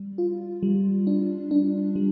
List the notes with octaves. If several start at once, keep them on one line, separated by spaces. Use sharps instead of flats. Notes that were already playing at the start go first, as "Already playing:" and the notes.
Already playing: G3
F4
G3
D4
D4
G3